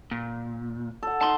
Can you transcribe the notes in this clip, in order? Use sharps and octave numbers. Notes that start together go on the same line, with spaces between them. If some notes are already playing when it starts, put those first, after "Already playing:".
A#2
A4 F#5
D#4 A5 A#5 C6